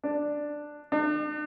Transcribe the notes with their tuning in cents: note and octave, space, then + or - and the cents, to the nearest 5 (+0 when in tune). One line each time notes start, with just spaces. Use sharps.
D4 +5
D4 +45